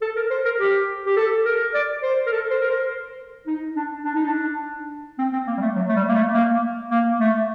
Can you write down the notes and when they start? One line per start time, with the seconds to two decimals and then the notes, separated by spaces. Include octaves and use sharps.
0.02 A4
0.16 A#4
0.30 C5
0.45 A#4
0.59 G4
1.06 G4
1.17 A4
1.45 A#4
1.74 D5
2.03 C5
2.26 A#4
2.32 A4
2.50 C5
2.61 A#4
2.70 C5
3.47 D#4
3.76 D4
4.04 D4
4.15 D#4
4.26 D4
5.19 C4
5.33 C4
5.47 A#3
5.57 G3
5.61 A3
5.76 F#3
5.88 A3
5.96 G3
6.09 A#3
6.14 A3
6.34 A#3
6.91 A#3
7.20 A3